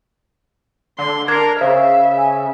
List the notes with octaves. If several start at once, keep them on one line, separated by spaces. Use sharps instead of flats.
D3 C6
D4 A#4 G#6 C7
C#3 C5 E5 F5
G#5